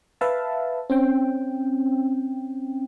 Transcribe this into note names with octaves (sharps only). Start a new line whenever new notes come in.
B4 E5 F5 A5
C4 C#4 G5